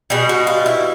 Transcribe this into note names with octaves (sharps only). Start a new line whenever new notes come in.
B2 G3 G#4
F#4
F4
E4